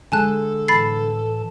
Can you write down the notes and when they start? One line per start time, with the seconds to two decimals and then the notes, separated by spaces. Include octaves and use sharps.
0.12 D3 G#3 A4 G#5 A5 F#6
0.68 A2 E3 A5 B5 A6 C7